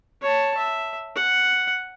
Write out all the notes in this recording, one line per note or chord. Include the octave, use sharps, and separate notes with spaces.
C#5 A5
E5
F#5